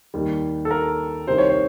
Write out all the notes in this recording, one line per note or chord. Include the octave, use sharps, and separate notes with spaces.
D#2 D#3 G3
A4
A#4
C2 C3 D#3 C5
C#5
C5